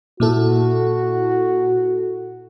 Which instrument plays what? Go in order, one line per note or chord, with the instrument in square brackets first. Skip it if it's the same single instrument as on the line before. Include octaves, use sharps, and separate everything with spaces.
[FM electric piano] A#2 E4 A4 [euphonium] F#4